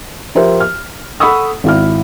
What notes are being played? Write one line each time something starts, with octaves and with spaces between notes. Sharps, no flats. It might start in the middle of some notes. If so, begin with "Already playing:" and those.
F3 G4 A#4 C5 E5
F6
A4 F#5 B5 C#6 D#6 E6
G#1 E4 F6